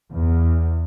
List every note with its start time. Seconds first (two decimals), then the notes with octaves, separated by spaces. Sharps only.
0.11 E2